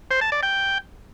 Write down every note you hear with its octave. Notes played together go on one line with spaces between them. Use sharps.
C5
A5
D5
G5